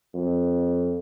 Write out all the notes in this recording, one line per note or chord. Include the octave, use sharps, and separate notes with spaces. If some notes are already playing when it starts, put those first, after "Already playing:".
F2